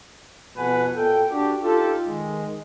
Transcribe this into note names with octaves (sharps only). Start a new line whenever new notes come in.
F2 B2 B4 F#5 G#5
A#2 A4 G5
D4 F#4 G4
D#4 F4 G4 A4
D#3 G#3